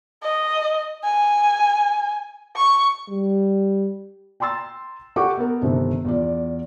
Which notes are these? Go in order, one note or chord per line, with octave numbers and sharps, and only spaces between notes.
D#5
G#5
C#6
G3
G5 A#5 C6 E6 A6
G4 A4 F#5 C#6 D6
B3 A#4
G1 C3 D#3
E2 F4 D5